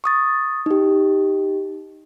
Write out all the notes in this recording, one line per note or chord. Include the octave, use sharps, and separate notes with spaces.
C#6 D#6 A6
D#4 G4